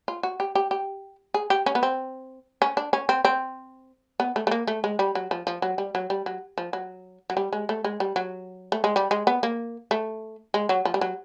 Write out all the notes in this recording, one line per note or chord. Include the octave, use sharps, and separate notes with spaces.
F4
F#4
G4
G4
G4
G#4
G4
C#4
B3
C4
C#4
D4
C#4
C4
C4
B3
A3
A3
A#3
A3
G#3
G3
F#3
F3
F3
F#3
G3
F#3
G3
F#3
F3
F#3
F#3
G3
G#3
A3
G#3
G3
F#3
A3
G#3
G3
G#3
B3
A#3
A3
G#3
F#3
F3
G3
F#3